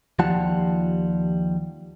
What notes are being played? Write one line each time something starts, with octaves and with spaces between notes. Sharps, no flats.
D#2 F3 G3 F4 F#5 A5